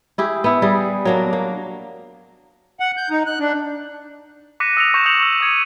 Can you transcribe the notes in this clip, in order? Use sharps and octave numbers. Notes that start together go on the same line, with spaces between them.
E4 G4 G#4
B3 E4
G3 G#4
F#3 A#3 D4
A#3
F#5
G6
D#4
F#6
D4
D6 F#6 A#6 B6 C#7 D#7
D#6 E6 A#6 C#7 D#7 F7
C#6 G6 C#7 E7
D#6 E6 G6 C#7 F7 F#7
E6
D#6 G#6 C#7 D#7